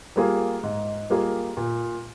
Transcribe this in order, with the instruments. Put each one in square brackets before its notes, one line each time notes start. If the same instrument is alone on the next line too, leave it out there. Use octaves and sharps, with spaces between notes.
[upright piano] G3 A#3 F4 G#4
G#2
G3 A#3 F4 G#4
A#2